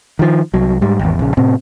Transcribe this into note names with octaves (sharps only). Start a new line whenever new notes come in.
D#3 F3
C2 F#3
G#2 G3
G#1 E2
A#1 C#3
A2 C3 C4